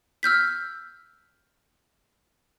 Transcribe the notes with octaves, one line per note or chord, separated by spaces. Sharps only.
E6 F6 G6 B6